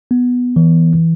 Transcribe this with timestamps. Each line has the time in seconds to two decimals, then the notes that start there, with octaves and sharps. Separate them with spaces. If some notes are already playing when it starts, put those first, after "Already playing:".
0.11 B3
0.56 E3